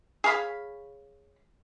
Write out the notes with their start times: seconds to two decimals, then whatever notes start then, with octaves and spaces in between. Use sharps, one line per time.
0.24 G#4 C#5 F5 B5